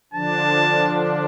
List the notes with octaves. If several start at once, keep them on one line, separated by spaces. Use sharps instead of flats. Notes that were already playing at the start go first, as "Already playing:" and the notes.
D3 F3 D4 A5